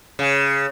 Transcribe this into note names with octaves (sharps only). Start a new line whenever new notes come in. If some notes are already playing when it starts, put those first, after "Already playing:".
C#3